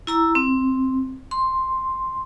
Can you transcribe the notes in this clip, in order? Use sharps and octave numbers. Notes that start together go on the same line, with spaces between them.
E4 A#5 E6
C4
C6